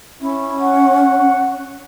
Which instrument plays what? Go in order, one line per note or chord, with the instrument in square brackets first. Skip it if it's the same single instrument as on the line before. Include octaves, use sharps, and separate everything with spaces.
[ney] C#4 [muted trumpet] E4
[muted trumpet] F#5